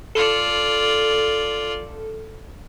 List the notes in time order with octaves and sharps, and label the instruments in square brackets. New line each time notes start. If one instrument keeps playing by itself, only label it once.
[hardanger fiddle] F4 D5 [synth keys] A4